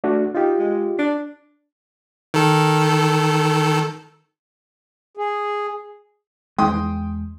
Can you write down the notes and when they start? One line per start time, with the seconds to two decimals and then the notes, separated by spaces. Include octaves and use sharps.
0.04 A3 D4 F#4
0.35 D#4 F4 G4
0.59 G#3
0.99 D4
2.34 D#3 A4
5.17 G#4
6.58 E2 G#3 G5 C6 D#6